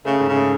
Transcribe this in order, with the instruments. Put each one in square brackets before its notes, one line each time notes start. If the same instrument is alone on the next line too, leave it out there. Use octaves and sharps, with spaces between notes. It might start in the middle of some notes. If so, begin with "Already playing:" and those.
[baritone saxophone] C#3 [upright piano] A3
[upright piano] G#2
[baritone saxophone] C#3
[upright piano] A3